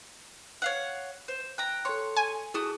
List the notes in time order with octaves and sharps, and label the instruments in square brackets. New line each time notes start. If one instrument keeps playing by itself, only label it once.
[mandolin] C#5 F5 F#5
C5
[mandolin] G5 A#5 [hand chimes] F#6
[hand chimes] A4 C6 [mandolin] C#5
[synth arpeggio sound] G#5
[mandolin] A3 F#4 D#6 [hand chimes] E4 G#4